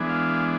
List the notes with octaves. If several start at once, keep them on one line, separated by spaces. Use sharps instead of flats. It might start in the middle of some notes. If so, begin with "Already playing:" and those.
Already playing: E3 G#3 B3 D4
F5